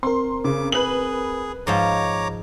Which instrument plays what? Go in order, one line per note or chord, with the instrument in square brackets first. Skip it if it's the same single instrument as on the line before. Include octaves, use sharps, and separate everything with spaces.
[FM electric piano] C4 A#4 [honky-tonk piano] C6
[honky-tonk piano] C#3 [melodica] D6
[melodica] G#4 [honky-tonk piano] B4 F#7
[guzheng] G#2 F3 D#4 [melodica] C#5 A#5 D6